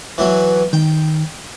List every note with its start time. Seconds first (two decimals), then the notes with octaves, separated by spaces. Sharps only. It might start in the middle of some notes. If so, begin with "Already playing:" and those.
0.18 E3 F#3
0.73 D#3 G5